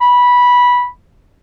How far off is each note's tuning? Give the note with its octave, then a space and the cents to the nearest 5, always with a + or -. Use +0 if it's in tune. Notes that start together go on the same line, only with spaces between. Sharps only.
B5 -15